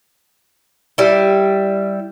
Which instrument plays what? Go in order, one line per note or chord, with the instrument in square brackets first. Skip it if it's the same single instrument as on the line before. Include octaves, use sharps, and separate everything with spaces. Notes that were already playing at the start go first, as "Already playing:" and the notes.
[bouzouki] G3 E4